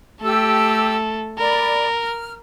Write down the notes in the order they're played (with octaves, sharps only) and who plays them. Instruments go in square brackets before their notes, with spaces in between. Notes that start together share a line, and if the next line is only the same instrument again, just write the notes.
[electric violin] A3 A4 [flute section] G4 E6
[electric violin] A#4 [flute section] D5 B5
[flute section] F6